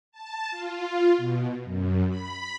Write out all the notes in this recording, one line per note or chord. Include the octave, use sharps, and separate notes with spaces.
A5
F4
B2
F#2
B5